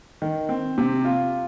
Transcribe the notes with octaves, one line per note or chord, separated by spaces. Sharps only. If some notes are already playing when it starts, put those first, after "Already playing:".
D#3
C4
C3
F4